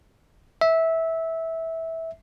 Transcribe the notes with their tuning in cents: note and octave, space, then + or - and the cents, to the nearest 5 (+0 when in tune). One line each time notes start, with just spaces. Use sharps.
E5 -15